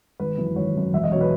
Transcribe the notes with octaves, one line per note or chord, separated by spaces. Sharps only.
G#1 B4
F#2 E3
G#1 C#5
F#2 E3
E1 E5
D#5
B2 F#3 C#5
B4